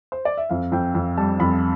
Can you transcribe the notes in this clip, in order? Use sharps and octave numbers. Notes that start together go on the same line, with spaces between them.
C5
D5
E5
F2 F5
F2 G5
F2
G3 A5
F2 B5